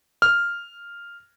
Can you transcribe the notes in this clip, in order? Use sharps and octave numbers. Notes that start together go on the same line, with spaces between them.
F6